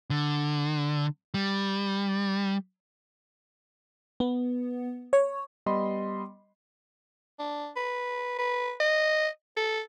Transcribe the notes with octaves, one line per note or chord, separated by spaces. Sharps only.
D3
G3
B3
C#5
G3 B3 D#5 B5 C6
D4
B4
B4
D#5
A4